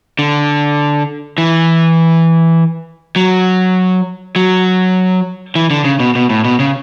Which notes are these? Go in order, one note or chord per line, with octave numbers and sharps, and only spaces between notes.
D3
E3
F#3
F#3
E3
D3
C#3
B2
B2
A2
B2
C#3